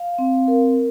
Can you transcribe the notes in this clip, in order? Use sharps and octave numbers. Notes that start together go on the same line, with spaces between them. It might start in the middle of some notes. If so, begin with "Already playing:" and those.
Already playing: F5
C4
A#4